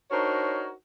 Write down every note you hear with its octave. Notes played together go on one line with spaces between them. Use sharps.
D4 D#4 F#4 A#4 C5 C#5